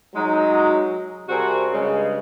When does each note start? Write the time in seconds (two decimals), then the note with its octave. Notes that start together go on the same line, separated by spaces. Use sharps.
0.15 F#3 G#3 D#4
1.28 C3 G3 C4 F#4 G#4 A#4
1.71 G2 C#3 G#3